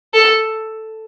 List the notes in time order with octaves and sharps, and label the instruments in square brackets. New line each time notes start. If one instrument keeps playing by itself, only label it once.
[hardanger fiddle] A4